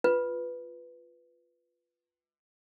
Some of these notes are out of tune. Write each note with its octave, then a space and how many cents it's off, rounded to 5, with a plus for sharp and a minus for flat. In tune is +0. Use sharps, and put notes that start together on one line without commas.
F4 +0 B4 +0